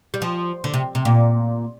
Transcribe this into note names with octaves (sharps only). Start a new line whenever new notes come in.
G3
F3
D3
C3
C3
A#2